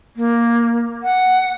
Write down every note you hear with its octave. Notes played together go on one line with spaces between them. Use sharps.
A#3
F#5